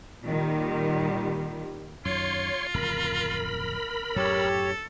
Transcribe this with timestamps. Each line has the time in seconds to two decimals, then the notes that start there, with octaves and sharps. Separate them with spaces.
0.24 A#2 D#3 G3
2.05 F#2 D#3 F4 C#5 C6
2.74 D1 F2 C#3 A#4 B5
4.16 F#2 A2 F#3 G4 A4 C#5